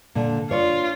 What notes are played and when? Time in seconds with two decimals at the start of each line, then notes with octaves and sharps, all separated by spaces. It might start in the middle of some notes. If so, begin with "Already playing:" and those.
0.15 A#2 D3
0.51 D4 F4 C#5